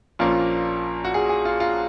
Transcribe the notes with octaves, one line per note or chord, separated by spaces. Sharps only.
A#1 A#2 F3 A#3 C#4 F4
F#4
G#4
G#4
F4
F4